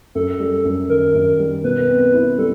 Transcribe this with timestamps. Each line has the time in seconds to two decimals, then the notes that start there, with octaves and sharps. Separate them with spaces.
0.15 F#2 A4
0.40 G3
0.65 F#2
0.89 D#3 A#4
1.15 F#2
1.39 G3
1.64 B2 B4
1.89 C4
2.14 E4
2.38 G3 A4